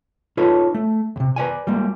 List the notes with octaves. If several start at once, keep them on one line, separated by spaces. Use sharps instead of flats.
D#4 F4 A4 B4 C#5
A3
D#2 C3
B4 C#5 D5 G#5
G3 G#3 A#3